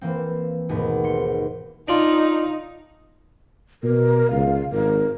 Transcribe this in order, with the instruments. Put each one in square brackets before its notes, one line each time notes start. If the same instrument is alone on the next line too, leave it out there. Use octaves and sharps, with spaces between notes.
[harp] E3 A#3 C4
D#2 G#2 B2 A3 B3
G#1 C6 C#7
[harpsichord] D4 F4 [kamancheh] D#4
[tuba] B2 [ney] A#4
[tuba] C#2 [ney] F5
[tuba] G#1 [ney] A#4